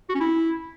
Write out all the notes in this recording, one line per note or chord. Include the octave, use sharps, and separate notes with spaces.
F#4
C#4
E4